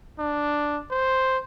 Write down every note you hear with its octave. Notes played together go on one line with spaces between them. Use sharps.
D4
C5